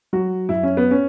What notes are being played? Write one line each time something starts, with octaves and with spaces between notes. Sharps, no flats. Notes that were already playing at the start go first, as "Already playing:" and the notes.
F#3 F#4
F#2 E4
C#4
B3
C#4